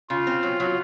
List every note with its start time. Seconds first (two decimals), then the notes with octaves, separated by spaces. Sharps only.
0.10 C#3 F4
0.27 C4
0.43 F#3
0.60 F#3